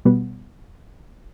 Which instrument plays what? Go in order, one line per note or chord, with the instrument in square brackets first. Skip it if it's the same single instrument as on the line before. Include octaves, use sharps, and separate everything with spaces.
[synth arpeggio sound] B2 G3 B3